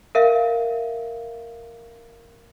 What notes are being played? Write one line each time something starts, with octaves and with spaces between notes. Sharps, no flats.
A#4 E5 F5